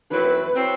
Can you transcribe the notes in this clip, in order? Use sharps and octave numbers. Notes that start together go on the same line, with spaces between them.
F#2 F#3 C4 E4 B4
F#3 C4 E4